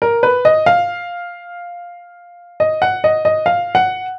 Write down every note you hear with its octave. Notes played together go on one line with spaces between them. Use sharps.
A#4
B4
D#5
F5
D#5
F#5
D#5
D#5
F5
F#5